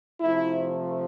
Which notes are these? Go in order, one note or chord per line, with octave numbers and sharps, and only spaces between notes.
C3 F3 A3 E4